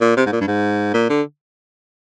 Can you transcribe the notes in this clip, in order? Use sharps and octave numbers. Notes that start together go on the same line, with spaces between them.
A#2
C3
G#2
A#2
G2
G#2
A#2
D3